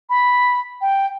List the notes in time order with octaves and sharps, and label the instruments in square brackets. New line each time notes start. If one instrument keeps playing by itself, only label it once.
[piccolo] B5
G5